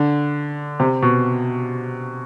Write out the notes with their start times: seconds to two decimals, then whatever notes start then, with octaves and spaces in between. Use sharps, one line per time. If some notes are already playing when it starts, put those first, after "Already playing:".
Already playing: D3
0.80 C3
1.02 B2